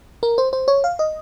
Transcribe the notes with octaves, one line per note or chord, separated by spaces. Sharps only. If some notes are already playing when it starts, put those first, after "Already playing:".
A#4
C5
C5
C#5
F5
D#5